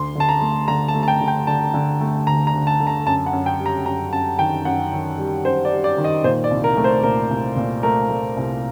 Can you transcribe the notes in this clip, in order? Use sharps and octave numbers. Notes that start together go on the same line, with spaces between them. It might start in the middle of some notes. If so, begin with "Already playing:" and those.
Already playing: D2 C6
D3 A5
A#5
A3
D3 A#5
A5
A3
A5
G5
D3
G5
D3 A5
D3
A3
D2 A#5
A#5
D2
A5
D3
A#5
F#2 A5
F#5
F#2
G5
G3
A#5
F#2 A#5
F#2 A5
D#3 G5
F#2 F#5
D#3
G3
F#2 C5
D5
G3
D5
D#3
D#5
A#2 C5
D5
C2
A#4
A3
C5
A#2 A#4
C2
A#2
A3 A#4
A3
C2